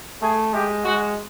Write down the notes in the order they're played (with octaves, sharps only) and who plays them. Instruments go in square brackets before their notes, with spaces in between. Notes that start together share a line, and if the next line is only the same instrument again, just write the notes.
[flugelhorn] A3 [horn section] G#4
[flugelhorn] G#3 [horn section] G4
[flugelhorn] G#3 [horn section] F#4